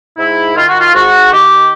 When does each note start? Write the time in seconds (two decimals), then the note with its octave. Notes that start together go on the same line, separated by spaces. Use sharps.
0.17 G#2 E4
0.55 D#3 F4
0.67 F#4
0.79 F4
0.93 G#2 F#4
1.31 D#3 G4